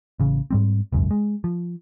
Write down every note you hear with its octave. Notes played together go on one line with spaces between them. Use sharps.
A1 C#3
G#2 G3 C4
E1 C#2 F#2
G#3
F3